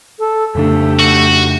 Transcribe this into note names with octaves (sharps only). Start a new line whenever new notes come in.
A4
F2 C#3 A3 D4 G4 A4
F#4